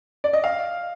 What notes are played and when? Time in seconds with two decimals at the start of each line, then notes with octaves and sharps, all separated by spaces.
0.24 D5
0.33 D#5
0.44 F5